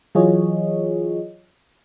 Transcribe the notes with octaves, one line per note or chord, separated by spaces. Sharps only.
E3 F#3 F4 G#4 C#5 D#5